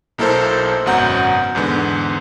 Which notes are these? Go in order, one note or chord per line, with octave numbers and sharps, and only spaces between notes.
B1 A#3 E4 A4 A#4 C5
G#1 F#2 B2 F#5 A#5 G6
E2 G#2 D3 B3